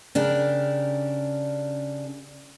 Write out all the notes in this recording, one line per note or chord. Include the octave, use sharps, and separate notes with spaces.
C#3 D4 G4 A#4